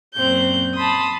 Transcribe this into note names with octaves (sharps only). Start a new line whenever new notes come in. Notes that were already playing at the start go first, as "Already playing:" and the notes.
F#2 A#2 C4 F#6 G6
A5 B5 C6 D#6